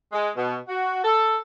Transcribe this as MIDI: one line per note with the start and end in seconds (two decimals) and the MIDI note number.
0.13 0.29 56
0.37 0.56 47
0.68 1.00 66
1.04 1.38 69